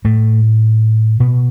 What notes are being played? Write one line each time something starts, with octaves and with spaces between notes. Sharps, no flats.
A2 A3
B2 B3